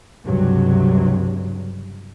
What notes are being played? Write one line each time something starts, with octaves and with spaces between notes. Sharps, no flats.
C#2 G2 C3 F#3